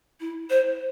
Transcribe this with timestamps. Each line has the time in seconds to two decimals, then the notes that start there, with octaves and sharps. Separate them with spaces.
0.20 E4
0.50 C5